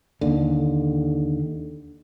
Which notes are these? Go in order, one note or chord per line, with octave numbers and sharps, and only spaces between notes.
D#2 D3